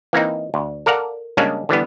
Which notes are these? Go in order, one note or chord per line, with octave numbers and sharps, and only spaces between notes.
E3 A#3 C4 D#4
D2
A4 A#4 D5 F5 F#5 A#5
C#3 G3 G#3 A#3 C#4 D4
D3 E3 G3 B3